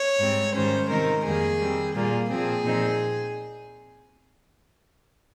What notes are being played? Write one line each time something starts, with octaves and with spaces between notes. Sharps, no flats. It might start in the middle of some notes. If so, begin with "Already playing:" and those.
Already playing: C#5
G#2 G3 C4
G#2 D#3 G3 C#4 C5
C3 D#3 G#3 C4 D#4 A#4
F2 D#3 G3 A#3 G#4
D#3 G3 C4
A#2 G3 A#3 F4 G#4
A#2 F3 C4 G#4
A#2 F3 C4 D#4